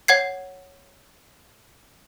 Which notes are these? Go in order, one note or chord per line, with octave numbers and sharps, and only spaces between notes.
C#5 F#5 G#6 C7